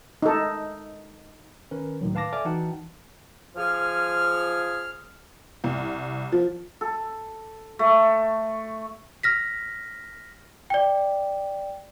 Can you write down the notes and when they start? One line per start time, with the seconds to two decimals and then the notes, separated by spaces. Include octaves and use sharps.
0.22 D#4 A4
1.71 D#3 C#4 A#4 B4
2.01 D2 A2 D3 D#3 F#3
2.15 B4 F5 A5 D6 A#6
2.33 A4 D5 E5 G#5 D6 F6
2.45 E3 D#4 F#4 F#5 G5 A5
3.56 F3 G#4 F6
5.64 C2
6.32 F3
6.81 A4
7.79 A3
9.23 F6 A#6 B6
10.70 D5 G5